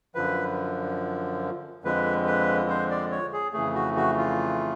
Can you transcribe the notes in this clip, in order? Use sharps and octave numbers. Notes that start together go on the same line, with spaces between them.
F#2 D3 F3 B4
F2 D3 F3 G#3 B4
B4
C5
D5
C#5
G#4
F2 C#3 E3 A3 G#4
F#4
F#4
F4